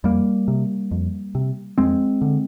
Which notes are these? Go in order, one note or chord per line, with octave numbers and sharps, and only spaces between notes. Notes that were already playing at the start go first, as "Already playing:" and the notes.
F2 G3 A#3
C3
F2
C3
F2 G#3 C4
D3